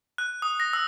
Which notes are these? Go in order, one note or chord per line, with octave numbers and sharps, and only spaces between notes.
F#6
D#6
A#6
E6